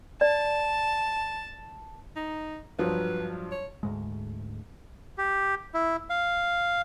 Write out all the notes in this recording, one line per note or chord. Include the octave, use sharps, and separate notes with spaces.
D5 A5
D#4
G2 F3 F#3 B4
C#5
D2 G#2 G#3
G4
E4
F5